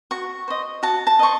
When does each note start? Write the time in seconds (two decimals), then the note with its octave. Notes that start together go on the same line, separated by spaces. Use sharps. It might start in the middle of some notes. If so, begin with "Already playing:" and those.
0.11 F#4 C#6
0.48 C5 D#5
0.83 F#4 A5
1.07 A5
1.19 C5 D#5 C#6